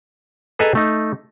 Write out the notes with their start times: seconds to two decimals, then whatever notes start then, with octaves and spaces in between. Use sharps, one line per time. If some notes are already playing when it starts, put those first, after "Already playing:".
0.59 G#4 A4 B4 D#5 G#5 A#5
0.75 A3 D#4